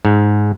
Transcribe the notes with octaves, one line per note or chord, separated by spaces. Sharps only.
G#2